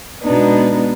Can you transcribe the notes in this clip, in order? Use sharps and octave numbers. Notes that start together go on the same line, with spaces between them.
B2 G#3 B3 D4 D#4